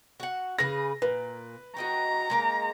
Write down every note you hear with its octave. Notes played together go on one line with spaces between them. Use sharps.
F#4 F#5
C#3 G#4 B4 A#6
A#2 B4
F#4 D#5 G5 A#5
G#3 A#3 D#4